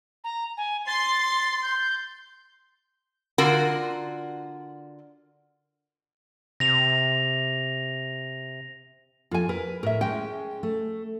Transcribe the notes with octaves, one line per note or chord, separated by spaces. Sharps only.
A#5
G#5
C6 A6
G6
D3 F4 F#4 A#4
C3 A#6 F7
F2 F4 G#5
A#4 B4
A2 A#4 E5
G#3 C#4 G5
A3